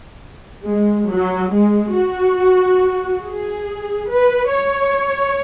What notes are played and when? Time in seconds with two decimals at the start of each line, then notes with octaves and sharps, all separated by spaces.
0.67 G#3
1.11 F#3
1.54 G#3
1.96 F#4
3.25 G#4
4.10 B4
4.54 C#5